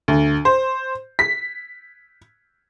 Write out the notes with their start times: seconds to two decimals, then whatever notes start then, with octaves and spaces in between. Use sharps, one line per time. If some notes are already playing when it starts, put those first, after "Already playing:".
0.08 D2
0.45 C5
1.19 B6